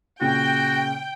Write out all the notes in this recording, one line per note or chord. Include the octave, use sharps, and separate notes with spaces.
A#2 C#3 F#4 G5